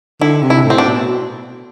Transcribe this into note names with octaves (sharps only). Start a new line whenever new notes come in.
D3 E4
C3
E4
A2
C4
D4
B2